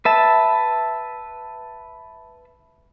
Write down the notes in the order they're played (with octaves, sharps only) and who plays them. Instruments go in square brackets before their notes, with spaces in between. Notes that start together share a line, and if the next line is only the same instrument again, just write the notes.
[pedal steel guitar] B4 E5 A5